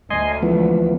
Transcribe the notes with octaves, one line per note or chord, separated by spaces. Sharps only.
D2 D#5 G#5 C6
E3 F3 B3